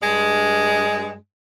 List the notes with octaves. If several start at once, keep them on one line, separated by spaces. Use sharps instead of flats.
G2 G#3